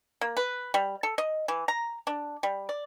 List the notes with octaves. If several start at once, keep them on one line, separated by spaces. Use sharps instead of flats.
A#3
B4
G3
A4
D#5
E3
A#5
D4
G3
D5